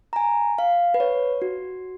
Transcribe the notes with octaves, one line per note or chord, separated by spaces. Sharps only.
A#5
G#5
F5
B4
C#5
F#4